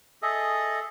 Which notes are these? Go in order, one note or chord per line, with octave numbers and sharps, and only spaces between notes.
G#4 A4 D#5 E5